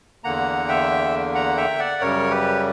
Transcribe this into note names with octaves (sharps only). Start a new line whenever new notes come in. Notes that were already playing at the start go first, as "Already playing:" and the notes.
E2 D3 A#3 F#5 A#5
E5 G5
F#5 A#5
E5 G5
D5 F#5
F#2 C#3 G3 A#4 C#5
G4 B4